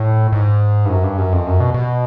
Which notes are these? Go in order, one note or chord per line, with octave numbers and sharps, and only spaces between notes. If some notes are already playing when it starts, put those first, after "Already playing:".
Already playing: A2
G#2
G2
F#2
G2
F#2
F2
F#2
B2
B2